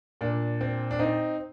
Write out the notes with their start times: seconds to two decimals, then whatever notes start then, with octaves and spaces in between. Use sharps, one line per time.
0.21 A#2 D4
0.61 C4
0.91 D4
0.99 C4 D#4